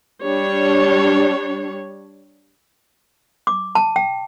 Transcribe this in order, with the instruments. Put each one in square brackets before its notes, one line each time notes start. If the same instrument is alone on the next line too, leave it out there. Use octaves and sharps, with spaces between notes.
[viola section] G3 D4 C#5
[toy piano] D6
A5
G5